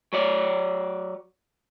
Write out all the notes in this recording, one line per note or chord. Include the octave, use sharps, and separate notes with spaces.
F#3 C#5 D5